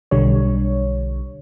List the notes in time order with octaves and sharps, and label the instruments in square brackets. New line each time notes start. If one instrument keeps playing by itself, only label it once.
[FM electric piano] B1 D3 G3 C#5